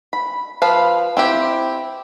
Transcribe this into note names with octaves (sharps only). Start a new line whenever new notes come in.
B5
F3 B4 F5
C4 E4 G4